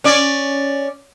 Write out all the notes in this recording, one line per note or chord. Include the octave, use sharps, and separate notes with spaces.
C#4 D5